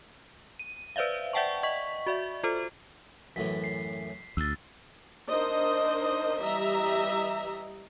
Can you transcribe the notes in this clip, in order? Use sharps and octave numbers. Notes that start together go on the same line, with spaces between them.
D#7
B4 C5 D5 E5 F5
D5 E5 F#5 G5 A5 C#6
D#5 C#6 B6
F#4 D5 E5
F4 A4 C5
F#2 A2 E3 B6
C7
D2 E6 A6
D4 D#4 A#4 C5 D#5
E3 G3 D#5 E5 A#5